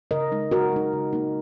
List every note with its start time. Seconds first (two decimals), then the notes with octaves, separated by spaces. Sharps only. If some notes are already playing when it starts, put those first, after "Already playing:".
0.11 C#3 A#4 D#5
0.32 G#3 D#4
0.51 C#3 F#4 A#4
0.72 G#3 D#4
0.93 C#3
1.13 A#3 D#4